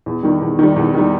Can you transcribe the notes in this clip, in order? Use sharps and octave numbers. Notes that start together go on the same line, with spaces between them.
E2
D#3 G3
E2
D#3 G3
E2
D#3 G3